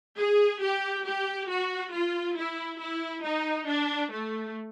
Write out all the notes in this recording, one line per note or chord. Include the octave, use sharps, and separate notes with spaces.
G#4
G4
G4
F#4
F4
E4
E4
D#4
D4
A3